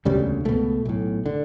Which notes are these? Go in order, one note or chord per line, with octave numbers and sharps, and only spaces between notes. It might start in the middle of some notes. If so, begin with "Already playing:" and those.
E1 D2 C#3 G3
C#2 B2 A3
B1 A2
D3